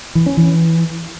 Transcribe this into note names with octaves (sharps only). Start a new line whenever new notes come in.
E3
C#4
E3